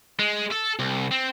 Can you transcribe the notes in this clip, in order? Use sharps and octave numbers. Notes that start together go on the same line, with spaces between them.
G#3
A4
C2
C4